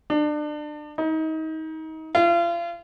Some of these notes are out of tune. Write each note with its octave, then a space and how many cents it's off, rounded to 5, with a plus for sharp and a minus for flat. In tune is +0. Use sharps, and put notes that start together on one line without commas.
D4 +30
D#4 +30
F4 -35